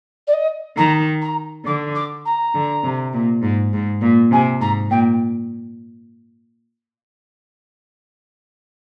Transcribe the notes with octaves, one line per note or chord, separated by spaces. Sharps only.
D5
D#5
D#3 A#5
A#5
D3 D6
D6
A#5
D3
C3
A#2
G#2
G#2
A#2
C3 G#5
G#2 A#5
A#2 G5